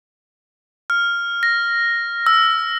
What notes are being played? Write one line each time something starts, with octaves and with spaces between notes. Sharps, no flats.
F6
A#6
E6